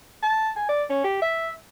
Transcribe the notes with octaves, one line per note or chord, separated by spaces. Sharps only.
A5
G#5
D5
C#4
G4
E5